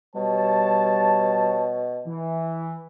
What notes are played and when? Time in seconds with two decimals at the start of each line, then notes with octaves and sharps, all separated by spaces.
0.15 B2 G3 C#5 A5
2.07 E3